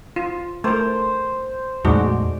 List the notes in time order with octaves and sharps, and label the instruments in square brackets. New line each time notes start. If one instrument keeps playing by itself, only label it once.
[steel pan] F4
[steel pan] A3 A#4 [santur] C5
[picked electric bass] F2 A#2 A3 [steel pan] G#3 D#4 F#4 [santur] D5